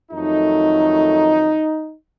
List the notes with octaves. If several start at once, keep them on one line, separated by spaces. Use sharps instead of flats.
F2 D#3 F#3 A3 D#4